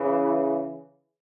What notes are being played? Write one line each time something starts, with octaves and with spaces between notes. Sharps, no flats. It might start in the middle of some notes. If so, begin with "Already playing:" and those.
Already playing: C#3 E3